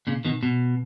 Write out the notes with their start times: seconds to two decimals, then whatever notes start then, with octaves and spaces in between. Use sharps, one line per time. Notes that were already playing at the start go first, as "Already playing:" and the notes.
0.07 A#2 C#3
0.25 B2 D#3
0.43 B2